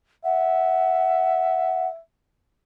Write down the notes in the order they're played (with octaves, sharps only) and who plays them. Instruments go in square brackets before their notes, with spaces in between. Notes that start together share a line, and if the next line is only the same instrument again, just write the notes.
[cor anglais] E5 [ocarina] F#5